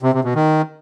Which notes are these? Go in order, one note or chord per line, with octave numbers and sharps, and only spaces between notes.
C3
C3
B2
D#3